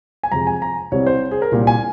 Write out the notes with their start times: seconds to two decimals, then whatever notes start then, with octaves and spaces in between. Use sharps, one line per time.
0.23 G#5
0.32 F2 C3 F3 G#3 A#5
0.47 G#5
0.62 A#5
0.92 C2 C3 G3 C4 C#5
1.07 C5
1.31 G#4
1.42 A#4
1.52 C2 A#2 G3
1.67 G#5